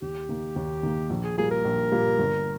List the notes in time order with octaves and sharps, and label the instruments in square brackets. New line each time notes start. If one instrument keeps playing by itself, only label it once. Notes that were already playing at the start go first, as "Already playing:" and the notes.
[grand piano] D#2 [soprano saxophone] G4
[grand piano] D#3 A#3
D#2
D#3 A#3
A#1
[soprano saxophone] G#4
[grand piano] A#2 G3 A#3 [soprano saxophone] G#4
[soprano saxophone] A#4
[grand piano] A#1
A#2 G3 A#3
G1